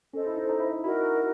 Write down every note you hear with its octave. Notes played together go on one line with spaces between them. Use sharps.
C#4 A4 C5 D#5
E4
D#4
D#4
E4
E4 F#4 A#4 D#5